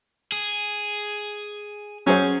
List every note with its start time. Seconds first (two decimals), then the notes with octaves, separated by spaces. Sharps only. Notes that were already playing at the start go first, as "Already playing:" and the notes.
0.32 G#4
2.06 F#3 C#4 G#4 C5